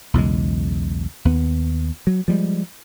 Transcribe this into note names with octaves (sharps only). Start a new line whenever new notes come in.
B1 E2 C#3 G#3
D#2 B3
F#3
F3 G3 G#3